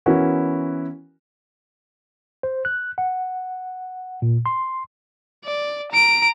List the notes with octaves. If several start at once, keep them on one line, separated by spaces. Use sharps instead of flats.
E3 B3 C#4 E4 F#4 A#4
C5
F#6
F#5
A#2
C6
D5
A#5 D7